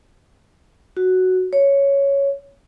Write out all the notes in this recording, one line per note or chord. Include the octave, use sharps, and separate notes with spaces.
F#4
C#5